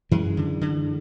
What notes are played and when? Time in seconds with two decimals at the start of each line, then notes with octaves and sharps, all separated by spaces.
0.11 F#2 E3 G#3
0.37 D3
0.61 D3